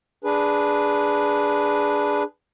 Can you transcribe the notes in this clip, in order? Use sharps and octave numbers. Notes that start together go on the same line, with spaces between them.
D4 G#4 B4